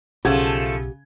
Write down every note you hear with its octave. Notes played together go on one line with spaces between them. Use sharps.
B1 C#3 F3 A3 G4 F#5 G#6